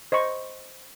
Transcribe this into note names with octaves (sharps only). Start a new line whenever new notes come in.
C5 D#5 B5 C#6